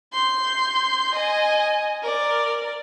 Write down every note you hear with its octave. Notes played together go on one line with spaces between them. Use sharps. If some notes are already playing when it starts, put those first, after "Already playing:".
C6 G6
D#5 G#5
A#4 D5